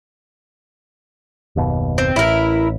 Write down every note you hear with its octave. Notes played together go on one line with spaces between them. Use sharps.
F#1 D#2 B2
C4
A1 E4 A#4